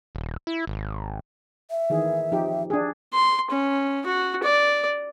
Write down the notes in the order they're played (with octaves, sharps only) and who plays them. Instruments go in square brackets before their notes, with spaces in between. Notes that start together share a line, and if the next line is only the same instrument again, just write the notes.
[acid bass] D#1
E4
G#1
[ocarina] E5
[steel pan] D#3 E3 G#4
F3 D#4 G4
D4 G#4
[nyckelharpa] C6
C#4
F#4
D5